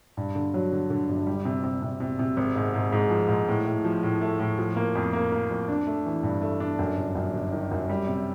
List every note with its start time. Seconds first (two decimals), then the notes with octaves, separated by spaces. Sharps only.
0.17 G2
0.35 D3
0.54 F#3
0.72 D3
0.90 D3
1.09 G1
1.27 G3
1.45 C3
1.64 C3
1.82 C3
2.00 C3
2.19 C3
2.37 G#1
2.56 G#2
2.74 G#2
2.92 G#2
3.10 F3
3.29 G#2
3.48 A2
3.66 A2
3.85 F3
4.03 A2
4.21 A3
4.40 A2
4.58 F3
4.76 A#3
4.95 F2
5.13 A#3
5.32 A#3
5.51 F2
5.68 D4
5.87 A3
6.06 E3
6.23 G2
6.41 A3
6.60 D4
6.79 F#2
6.97 G1
7.15 F#2
7.33 G1
7.52 D#3
7.71 F#2
7.89 G3
8.07 C3